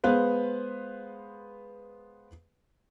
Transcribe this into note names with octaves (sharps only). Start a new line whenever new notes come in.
G#3 B3 B4 C5 F5